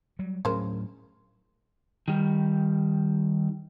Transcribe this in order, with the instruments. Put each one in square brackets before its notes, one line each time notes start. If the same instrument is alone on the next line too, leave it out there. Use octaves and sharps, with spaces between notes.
[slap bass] F#3 G3
[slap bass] A2 F#3 [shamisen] C#3 A#4 C5
[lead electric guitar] D#3 G3